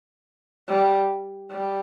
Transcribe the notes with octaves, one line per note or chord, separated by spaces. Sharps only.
G3
G3